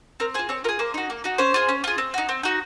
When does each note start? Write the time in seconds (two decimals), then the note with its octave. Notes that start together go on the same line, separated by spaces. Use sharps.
0.20 C4 A#4
0.34 F4 G#4 C5
0.49 C4 C#5
0.64 F4 A#4
0.69 G#4
0.79 A#3 C5
0.94 D#4 F#4
1.10 A#3
1.24 D#4 F#4
1.38 C#4 C5
1.54 F4 G#4
1.69 C#4
1.84 F4 G#4
1.98 C4
2.14 D#4 F#4
2.29 C4
2.43 D#4 F#4